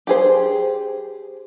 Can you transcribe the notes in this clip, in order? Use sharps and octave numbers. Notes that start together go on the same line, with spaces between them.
G4 G#4 C5